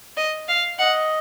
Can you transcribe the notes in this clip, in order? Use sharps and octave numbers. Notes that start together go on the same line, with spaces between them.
D#5
F5
D#5 F#5